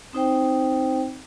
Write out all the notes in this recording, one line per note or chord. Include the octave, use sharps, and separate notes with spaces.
C4 D#4 C5 G5